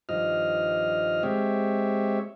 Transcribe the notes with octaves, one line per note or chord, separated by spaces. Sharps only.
G2 D#3 F3 D#5 F6
G#3 C4 G4 C#5 E5